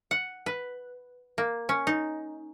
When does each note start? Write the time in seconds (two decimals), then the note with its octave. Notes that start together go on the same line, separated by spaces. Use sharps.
0.11 F#5
0.46 B4
1.38 A#3
1.69 C#4
1.87 D#4